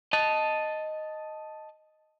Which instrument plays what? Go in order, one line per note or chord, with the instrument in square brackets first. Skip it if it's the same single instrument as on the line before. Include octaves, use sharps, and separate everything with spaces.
[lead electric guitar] D#5 A5